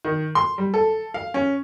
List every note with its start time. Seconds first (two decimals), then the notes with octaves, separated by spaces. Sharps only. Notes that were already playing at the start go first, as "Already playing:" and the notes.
0.05 D#3
0.35 C6
0.58 G3
0.74 A4
1.14 F5
1.34 C#4